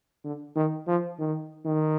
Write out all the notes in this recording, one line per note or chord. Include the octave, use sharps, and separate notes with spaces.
D3
D#3
F3
D#3
D#3